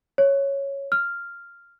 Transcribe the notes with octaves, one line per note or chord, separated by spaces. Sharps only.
C#5
F6